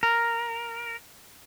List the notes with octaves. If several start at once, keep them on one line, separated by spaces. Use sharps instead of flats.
A#4